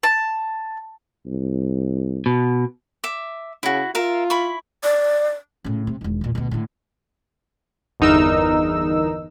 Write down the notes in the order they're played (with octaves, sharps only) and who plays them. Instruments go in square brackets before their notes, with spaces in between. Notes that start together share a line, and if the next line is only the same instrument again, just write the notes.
[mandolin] A5
[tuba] C2
[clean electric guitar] B2
[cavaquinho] E5 D6
[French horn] C#3 [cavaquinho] E4 F#4
[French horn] F4 [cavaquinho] A#4 E5 F5
[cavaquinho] E4 B5 C#6
[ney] D5
[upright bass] A2 C#3
C3
E1 D#3
E2 A#2
D2 B2
A2 D3
[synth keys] G1 E2 D#4 A#4 E6